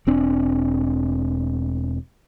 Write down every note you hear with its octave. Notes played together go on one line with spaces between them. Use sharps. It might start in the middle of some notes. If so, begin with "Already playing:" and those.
E1 C4 D4